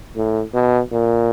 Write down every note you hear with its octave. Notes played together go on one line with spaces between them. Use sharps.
A2
B2
A#2